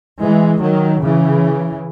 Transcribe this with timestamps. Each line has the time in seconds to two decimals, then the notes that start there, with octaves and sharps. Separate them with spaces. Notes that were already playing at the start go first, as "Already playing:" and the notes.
0.20 E3 G#3
0.60 D#3 F#3
1.01 C#3 E3